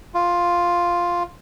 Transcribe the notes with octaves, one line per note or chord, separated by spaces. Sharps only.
F4